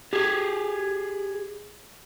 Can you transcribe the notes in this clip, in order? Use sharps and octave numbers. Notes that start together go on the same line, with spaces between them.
G4 G#4